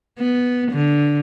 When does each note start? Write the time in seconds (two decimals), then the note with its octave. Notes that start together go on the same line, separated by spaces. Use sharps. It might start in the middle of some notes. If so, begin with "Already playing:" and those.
0.19 B3
0.72 D3